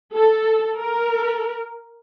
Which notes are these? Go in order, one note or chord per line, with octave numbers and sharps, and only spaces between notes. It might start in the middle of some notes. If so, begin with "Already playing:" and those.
A4
A#4